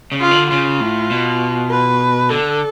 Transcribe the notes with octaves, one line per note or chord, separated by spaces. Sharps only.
C#3
F4
D3
C#3 F4
A2
B2
B4
D3 A4